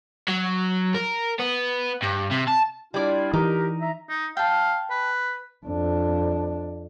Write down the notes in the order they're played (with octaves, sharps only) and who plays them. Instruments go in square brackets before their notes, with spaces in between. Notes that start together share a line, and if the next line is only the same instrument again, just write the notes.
[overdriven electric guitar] F#3
A#4
B3
G2
C3
A5
[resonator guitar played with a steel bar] G3 D5 [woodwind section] D4 E4 F4
[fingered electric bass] E3 [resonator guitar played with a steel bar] D#4 [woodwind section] G4 A#4
[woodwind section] E5 A#5
[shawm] D#4
[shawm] F5 [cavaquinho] G5 A5
[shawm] B4
[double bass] F2 D4